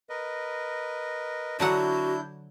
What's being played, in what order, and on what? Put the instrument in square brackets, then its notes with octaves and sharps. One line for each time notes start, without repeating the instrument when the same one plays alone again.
[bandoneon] A#4 B4 D#5
[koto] D3 F#3 F#5 [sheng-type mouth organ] D4 E4 G6 [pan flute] F#4